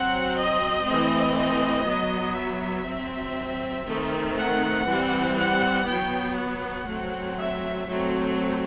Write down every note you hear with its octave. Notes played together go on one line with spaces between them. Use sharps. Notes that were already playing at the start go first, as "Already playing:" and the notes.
Already playing: F#3 C4 F#5
D#5
E3 A3 C4
D#5
F#3 B3
E5
F#3 C4
D#3 A3 C4
F#5
E3 G3 C4
F#5
F#3 B3 G5
F#5
F#3 A3 C4
E5
F#3 A3 C4